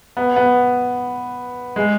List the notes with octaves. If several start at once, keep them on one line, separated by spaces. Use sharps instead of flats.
B3
B3
G#3